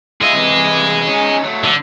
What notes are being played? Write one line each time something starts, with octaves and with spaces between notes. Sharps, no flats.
F4 G#4 D#5 E5
C3 E3
C#4 D#4
F#3 A3
D3